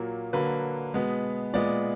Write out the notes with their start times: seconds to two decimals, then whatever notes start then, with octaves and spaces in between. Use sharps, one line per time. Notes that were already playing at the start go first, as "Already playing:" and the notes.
Already playing: A#2 F#3 A#3
0.33 D3 F#3 A#3 B4
0.94 B2 G#3 B3
1.54 A#2 G#3 B3 D5